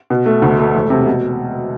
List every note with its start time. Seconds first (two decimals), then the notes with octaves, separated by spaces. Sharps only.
0.10 B2
0.26 A3
0.42 D2
0.59 A3
0.75 E1
0.90 C3
1.06 B2